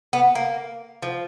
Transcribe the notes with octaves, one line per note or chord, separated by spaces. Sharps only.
B3
A#3
F3